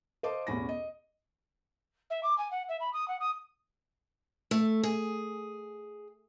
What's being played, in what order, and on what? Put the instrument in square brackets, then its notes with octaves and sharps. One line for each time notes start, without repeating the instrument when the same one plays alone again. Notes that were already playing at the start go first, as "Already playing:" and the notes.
[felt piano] C5 D#5 F5 A5 C6 D6
A1 E2 B2 C#4 B5 A#6
D#5
[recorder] E5
D6
G#5
F#5
E5
B5
D#6
F#5
D#6
[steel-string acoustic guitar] A3
G#4